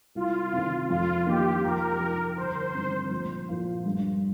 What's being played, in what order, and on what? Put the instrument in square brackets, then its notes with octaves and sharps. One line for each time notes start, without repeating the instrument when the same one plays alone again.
[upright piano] C2 [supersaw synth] F4
[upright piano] C3 D#3
[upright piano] F2 [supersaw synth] F4
[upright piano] D#3 A#3 D#4 [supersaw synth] G4
[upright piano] F2 [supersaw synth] A#4
[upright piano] F3 D#4
[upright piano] G1 [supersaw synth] C5
[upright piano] G2 D#3 C4
A#1
A#2 F3 A#3 F4
G2